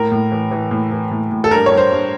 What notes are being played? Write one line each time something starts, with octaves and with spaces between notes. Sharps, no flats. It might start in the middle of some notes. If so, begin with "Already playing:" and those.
Already playing: A2 A#4
A2
E3
E3
A2
E3
A2
A2
A4
G2 A#4
G2 C#5
C5
G2